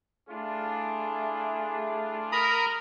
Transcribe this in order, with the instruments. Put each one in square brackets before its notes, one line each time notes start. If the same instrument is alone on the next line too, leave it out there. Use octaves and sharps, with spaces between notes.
[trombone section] A3 E4 G#4 [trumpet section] D4 F4
[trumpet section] A#4 [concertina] A#5 B5 D#6